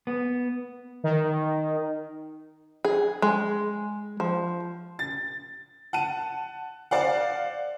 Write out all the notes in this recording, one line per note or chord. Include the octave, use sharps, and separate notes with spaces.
B3
D#3
G#4
G#3
F3
A6
F#5 A5 D#7
C5 D5 F5 F#5